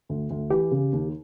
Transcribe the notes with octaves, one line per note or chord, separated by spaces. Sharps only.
D2
D2
E3 G4
C#3
D#2